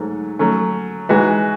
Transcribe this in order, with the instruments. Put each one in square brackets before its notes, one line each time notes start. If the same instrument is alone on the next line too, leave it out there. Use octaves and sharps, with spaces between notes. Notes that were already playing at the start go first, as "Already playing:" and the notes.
Already playing: [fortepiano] G#2 F#3 A3
F#3 A3 C#4
E3 G#3 D#4 F#4 B4